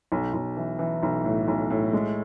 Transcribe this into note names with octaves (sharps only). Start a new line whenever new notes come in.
B1
B1
E3
E3
B1
A2
B1
A2
G#3